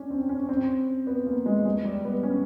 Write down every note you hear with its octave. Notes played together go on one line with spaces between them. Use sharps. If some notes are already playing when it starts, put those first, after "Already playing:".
Already playing: C#4 D4
C4
C#4
C#4
C4
B3
A#3
G#3
G#3
G3
B3
C#4